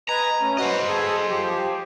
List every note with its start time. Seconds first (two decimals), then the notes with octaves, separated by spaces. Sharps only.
0.09 B4 D#5 G#5 A#5
0.41 A3 C#4
0.58 F#4 B4 C5 D#5
0.88 G#4 A4 G#5
1.30 F3 G4